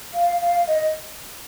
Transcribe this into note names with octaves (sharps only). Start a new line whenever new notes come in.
F5
F5
D#5